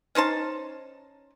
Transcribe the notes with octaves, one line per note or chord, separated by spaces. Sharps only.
C#4 D#4 C5 A5